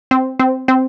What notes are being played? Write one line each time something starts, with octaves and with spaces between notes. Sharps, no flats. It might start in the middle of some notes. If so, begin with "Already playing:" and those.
C4
C4
C4